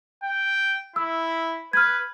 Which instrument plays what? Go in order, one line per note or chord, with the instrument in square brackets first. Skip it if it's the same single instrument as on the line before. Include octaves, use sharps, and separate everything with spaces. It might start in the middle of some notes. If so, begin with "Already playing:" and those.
[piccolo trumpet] G5
[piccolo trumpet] E4 [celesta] E6
[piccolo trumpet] B4 [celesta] F6 G#6